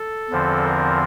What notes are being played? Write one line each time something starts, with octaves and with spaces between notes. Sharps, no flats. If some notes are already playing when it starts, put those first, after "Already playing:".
Already playing: A4
E2 D3 F3 C4
A#4